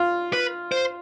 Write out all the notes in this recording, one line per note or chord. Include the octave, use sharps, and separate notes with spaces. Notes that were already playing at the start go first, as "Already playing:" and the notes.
Already playing: F4
B4
C5